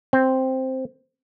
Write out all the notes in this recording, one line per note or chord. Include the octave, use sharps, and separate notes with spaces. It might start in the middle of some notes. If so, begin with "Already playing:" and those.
C4